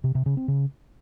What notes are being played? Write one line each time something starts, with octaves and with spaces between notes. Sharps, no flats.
C3
C3
C#3
C4
C#3